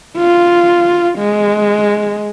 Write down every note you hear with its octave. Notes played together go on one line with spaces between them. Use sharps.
F4
G#3